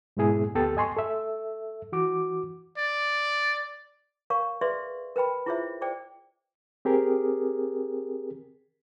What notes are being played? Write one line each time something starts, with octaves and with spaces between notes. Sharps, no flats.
G#2 B2 G#3 B3 E4 G#4
D2 B3 G4 A4 G5 A6
D#5 G#5 C6 C#6
A4 E5
E3 F#4 D6
D5
A#4 C#5 F5 C#6
G#4 B4 D5 E5 C6
A#4 B4 G5 B5
E4 F4 G#4 C5 C#5 E5
G#4 C5 D5 G5
C4 G4 G#4 A#4